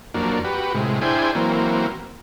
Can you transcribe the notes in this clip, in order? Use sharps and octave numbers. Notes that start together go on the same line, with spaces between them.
F2 F#3 A#3 D4
F#4 G4 B4
A2 C3 G#3
D4 E4 G#4 C5 G5 G#5
E3 F#3 A#3 C4